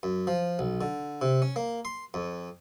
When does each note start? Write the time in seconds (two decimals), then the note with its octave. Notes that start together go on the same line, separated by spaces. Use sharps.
0.03 F#2
0.27 F3
0.59 B1
0.81 D3
1.22 C3
1.42 C#4
1.56 A#3
1.85 C6
2.14 F2